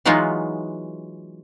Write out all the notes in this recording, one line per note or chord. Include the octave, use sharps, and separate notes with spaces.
E3 F#3 G#3 B3 D#4 F4